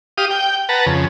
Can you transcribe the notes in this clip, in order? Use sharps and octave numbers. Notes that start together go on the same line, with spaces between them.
G4 F5 D#6
G5
B4 F#5 A5 A#5
F2 C#3